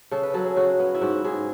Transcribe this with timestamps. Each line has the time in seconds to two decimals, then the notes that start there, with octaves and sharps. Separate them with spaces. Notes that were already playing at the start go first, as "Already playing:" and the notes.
0.11 C#3 A4
0.23 B4
0.34 F#3 A4
0.46 G#4
0.57 C#3 F#4
0.79 B3
0.95 E4
1.01 G#2 F#4
1.24 G#2 G#4